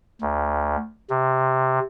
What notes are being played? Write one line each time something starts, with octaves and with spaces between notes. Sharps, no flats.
D2
C3